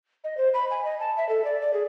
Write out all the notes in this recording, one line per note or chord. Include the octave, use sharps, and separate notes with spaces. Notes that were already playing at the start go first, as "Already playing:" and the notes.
D#5
C5
B5
G#5
D#5
A5
E5
A4
D5
D5
G#4